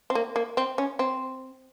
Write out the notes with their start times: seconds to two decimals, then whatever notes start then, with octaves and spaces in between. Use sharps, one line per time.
0.10 C4
0.15 A#3
0.36 A#3
0.57 C4
0.78 C#4
0.99 C4